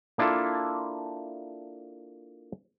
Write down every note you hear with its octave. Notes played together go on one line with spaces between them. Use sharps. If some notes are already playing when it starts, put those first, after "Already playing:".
A#3 D4 E4 F4 A4